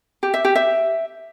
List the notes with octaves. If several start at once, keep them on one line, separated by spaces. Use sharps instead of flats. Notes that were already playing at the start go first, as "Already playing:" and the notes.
G4
E5
G4
E5